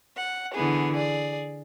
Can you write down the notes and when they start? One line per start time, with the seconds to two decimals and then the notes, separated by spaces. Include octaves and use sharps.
0.16 F#5
0.54 D3 E3 B3 G#4
0.94 G#4 D5